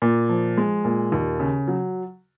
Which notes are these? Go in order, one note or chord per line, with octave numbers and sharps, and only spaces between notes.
A#2
F3
G#3
A#2
D#2
C#3
F#3